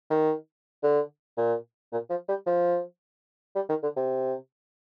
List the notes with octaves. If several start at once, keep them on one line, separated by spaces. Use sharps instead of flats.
D#3
D3
A#2
A#2
F3
G3
F3
G3
D#3
D3
C3